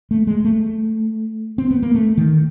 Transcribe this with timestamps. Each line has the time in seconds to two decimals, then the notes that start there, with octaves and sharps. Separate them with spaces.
0.11 A3
0.27 G#3
0.45 A3
1.58 C4
1.71 B3
1.83 A#3
1.95 A3
2.17 D#3